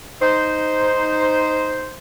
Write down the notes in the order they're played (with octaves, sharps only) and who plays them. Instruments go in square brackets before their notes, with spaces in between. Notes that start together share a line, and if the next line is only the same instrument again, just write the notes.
[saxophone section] D#4 C5